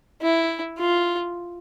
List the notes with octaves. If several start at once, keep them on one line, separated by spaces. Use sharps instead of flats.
E4
F4